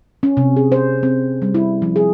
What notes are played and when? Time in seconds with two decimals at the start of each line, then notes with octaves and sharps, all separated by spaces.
0.23 C#4
0.37 C3
0.57 G#4
0.72 C5
1.03 C4
1.42 G3
1.55 E4
1.82 F3
1.96 G#4